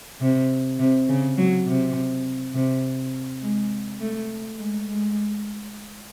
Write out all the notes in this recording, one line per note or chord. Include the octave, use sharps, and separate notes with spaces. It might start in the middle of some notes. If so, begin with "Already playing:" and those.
C3
C3
C#3
F#3
C3
C3
G#3
A3
G#3
G#3